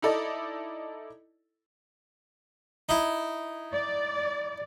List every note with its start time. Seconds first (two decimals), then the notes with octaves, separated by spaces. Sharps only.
0.02 D#4 E4 A4 D5 D#5
2.89 D#4 E4
3.73 D5